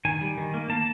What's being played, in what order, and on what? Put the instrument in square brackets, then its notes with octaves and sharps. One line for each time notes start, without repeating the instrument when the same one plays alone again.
[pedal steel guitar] D#3 G#5
G3
D#3
A#3
A#3 A5